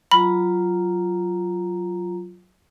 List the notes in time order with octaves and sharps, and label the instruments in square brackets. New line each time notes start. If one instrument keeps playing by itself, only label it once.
[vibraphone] F#3 F4 A#5 [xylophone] B5